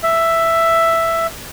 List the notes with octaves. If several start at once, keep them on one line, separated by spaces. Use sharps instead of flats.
E5